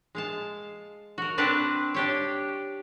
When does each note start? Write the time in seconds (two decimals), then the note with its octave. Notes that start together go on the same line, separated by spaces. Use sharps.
0.15 G#3 F5 A5
1.18 F#4 A#4
1.38 C4 D4 B4 F#5 A5 A#5
1.94 D4 G4 C#5